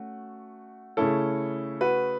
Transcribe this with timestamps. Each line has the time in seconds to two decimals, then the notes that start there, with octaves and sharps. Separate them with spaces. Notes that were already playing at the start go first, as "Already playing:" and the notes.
Already playing: A3 C#4 F#4
0.97 C#3 A3 C#4 E4 A4
1.81 F#4 B4